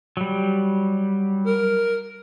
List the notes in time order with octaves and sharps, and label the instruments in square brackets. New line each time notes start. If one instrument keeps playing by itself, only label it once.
[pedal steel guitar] F#3 G3
[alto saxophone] A#4